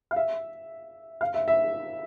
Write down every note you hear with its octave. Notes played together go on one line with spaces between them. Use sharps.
F5
E5
F5
E5
E5